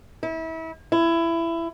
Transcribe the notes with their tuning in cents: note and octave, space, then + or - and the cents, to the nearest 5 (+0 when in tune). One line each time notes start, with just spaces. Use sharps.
E4 -30
E4 +20